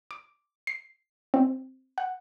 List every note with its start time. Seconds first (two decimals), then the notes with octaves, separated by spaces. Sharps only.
0.11 D6
0.67 C7
1.34 C4
1.98 F#5